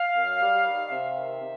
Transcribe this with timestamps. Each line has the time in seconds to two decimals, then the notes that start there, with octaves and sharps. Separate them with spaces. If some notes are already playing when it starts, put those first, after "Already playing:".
Already playing: F5
0.15 F#2
0.41 G3
0.66 D#3
0.90 C3 E5
1.16 D#3
1.41 C3